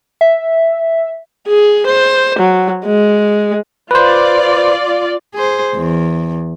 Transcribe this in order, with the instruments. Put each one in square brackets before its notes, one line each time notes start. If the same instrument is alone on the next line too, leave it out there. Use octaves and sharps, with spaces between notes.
[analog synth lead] E5
[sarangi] G#4
C5
F#3
G#3
[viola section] F4 D5 [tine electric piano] B4 C5
[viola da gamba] G#4 C5
E2